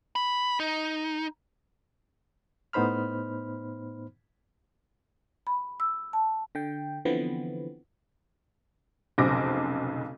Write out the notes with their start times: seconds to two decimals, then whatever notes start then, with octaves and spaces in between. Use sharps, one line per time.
0.16 B5
0.60 D#4
2.73 A2 B3 D#4 C5 B5 F6
5.47 B5
5.80 E6
6.13 A5
6.55 D3 G5
7.05 D3 E3 F3 B3 C4
9.18 F1 B1 C#3 C5 D6 A#6